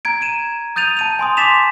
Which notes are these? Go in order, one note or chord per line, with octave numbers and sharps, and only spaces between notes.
A#5 G#6 D7
G#6 D#7 E7
D#6 G6 A6 D#7 F7
A5 D#7 F7
G#5 C6 D#6
C6 D6 A6 B6 E7 F7